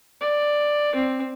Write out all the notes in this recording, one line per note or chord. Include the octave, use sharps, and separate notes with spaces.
D5
C4